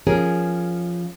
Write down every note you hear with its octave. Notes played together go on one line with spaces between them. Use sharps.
F3 C#4 G#4 A#4